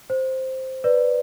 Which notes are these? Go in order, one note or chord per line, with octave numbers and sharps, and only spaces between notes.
C5
B4 D5